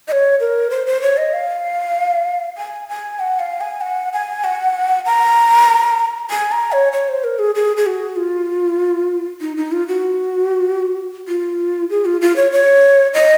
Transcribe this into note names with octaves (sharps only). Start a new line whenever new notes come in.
D#5
C#5
A#4
C5
C5
C#5
D#5
F5
G#5
G#5
F#5
F5
G#5
F#5
G#5
F#5
A#5
G#5
A#5
C#5
C#5
C5
A#4
G#4
G#4
G#4
F#4
F4
D#4
D#4
F4
F#4
F4
G#4
F4
F4
C#5
C#5
D#5